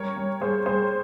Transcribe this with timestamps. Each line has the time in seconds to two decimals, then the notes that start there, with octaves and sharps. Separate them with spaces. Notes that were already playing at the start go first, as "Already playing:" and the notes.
Already playing: G3 C#4 A#4 C#5
0.17 G3
0.41 G3 G#4 C5
0.66 G3 G#4 C5